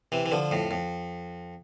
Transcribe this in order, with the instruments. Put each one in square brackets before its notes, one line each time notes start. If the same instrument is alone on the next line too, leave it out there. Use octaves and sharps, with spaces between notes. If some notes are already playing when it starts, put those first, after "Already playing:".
[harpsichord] C3 E3
E3
D3 F3
F2 A2
F2